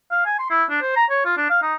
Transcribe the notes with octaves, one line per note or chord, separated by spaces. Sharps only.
F5
G#5
C6
E4
D4
C5
A#5
C#5
F4
D4
F5
D#4